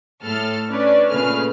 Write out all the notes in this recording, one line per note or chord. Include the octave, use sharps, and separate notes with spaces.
A2 A4 F6
C#4 D4 B4 D5
A#2 C#3 A3 G#4 B4 F6